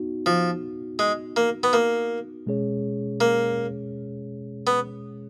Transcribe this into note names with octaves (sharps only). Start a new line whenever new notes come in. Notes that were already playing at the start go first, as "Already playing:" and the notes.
Already playing: B3 D#4 F#4
F3
G#3
A#3
B3
A#3
B2 G#3 C#4 G#4 C#5
A#3
B3